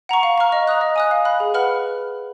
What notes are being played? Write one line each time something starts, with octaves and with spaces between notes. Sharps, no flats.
F#5 A#5 C#6
F5
A#5 C#6 F6
D#5
A#5 D#6 F#6
D#5
G#5 D#6 F#6
F5
B5 F#6
G#4
B4 F#5 B5 F6